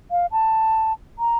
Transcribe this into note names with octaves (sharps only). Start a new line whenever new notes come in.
F5
A5
A#5